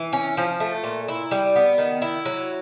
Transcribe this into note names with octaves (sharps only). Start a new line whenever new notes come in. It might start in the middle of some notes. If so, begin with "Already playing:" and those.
Already playing: E3
C#4
F3
A3
A#2
E4
G3
B3
D#3
E4
F#3